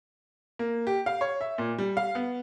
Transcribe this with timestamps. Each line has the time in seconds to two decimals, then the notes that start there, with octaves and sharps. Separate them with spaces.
0.59 A#3
0.87 G4
1.06 F5
1.21 C#5
1.41 E5
1.58 A#2
1.79 G3
1.97 F5
2.15 B3